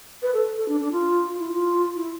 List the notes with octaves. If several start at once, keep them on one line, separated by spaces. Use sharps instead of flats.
B4
A4
A4
D4
D4
F4
F4
E4
F4
E4